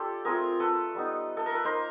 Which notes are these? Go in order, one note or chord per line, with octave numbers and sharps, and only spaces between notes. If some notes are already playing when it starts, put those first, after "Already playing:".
Already playing: D4 F4 G4 A4
A3 C4 F4 G#4 A#4
A4 B4
G3 B3 D#4
A4
A#4
B4
A#3 D#4 A#4 C5